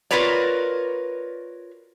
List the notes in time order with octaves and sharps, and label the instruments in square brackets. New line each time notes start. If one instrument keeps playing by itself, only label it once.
[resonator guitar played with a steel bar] F4 F#4 A#4 B4 C#5 D5